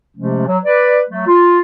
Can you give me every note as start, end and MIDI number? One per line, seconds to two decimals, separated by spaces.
0.17 0.45 48
0.17 0.45 53
0.17 0.45 56
0.17 0.45 57
0.17 0.45 61
0.47 0.57 54
0.65 1.00 71
0.65 1.00 74
1.10 1.26 54
1.10 1.26 57
1.27 1.60 65